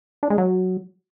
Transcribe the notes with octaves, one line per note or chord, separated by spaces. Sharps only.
D4
G#3
F#3